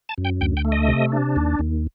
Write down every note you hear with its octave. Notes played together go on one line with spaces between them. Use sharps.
A5
F#2
G5
D2 G5
G5
A3
D#5
C3
D4
D#2
D#2